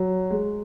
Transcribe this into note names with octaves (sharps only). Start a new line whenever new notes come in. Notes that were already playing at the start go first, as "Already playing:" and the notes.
Already playing: F#3
G#3